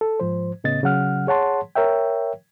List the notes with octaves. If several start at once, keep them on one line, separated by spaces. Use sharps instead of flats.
A4
G#2 F3 C5
A2 C#3 B3 D#5 A6
C#3 F#3 F#5 F6
G#4 C#5 F#5 A5 C6
A#4 C#5 E5 G5